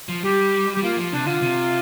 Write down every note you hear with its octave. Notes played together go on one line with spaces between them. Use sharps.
F3
G3 G4
G3 G4
A#3 F4
F3
C3 D4
D3 F4
C3